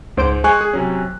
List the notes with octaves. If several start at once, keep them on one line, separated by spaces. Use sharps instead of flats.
C#2 G#2 C5 D7
G#3 G#5 C#6 F#6
G#4
C3 F#3 C#4